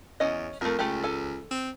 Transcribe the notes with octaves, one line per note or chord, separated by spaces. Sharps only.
E2 C#4 D#5
F2 A3 A#4
C#2 A3 G4
A4 G#5
C4